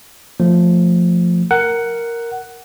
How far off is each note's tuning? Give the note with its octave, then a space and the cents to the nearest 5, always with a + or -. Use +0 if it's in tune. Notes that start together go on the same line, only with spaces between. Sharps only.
F3 +5 A3 +25
A#4 +0 F#5 +10